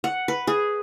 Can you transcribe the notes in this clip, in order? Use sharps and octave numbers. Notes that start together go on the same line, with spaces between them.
F#5
B4
G#4